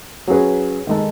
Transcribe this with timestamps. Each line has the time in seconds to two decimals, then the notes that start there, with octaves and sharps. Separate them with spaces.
0.28 F#3 C#4 G#4 B4
0.87 D#3 G#3 D#4 A4